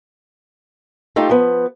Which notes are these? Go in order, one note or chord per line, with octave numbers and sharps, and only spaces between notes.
A3 D#4 F4 G4
F3 B3